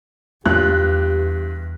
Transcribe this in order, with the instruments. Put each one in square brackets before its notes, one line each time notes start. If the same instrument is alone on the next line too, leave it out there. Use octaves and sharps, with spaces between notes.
[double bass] E2 [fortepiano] G2 F4 [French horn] G4 [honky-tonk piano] F#6